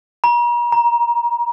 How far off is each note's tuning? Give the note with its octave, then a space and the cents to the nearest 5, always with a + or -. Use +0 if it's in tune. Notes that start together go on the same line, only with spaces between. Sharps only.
A#5 +45
A#5 +20